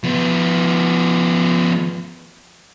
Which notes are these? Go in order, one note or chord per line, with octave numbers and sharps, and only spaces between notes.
F3 B3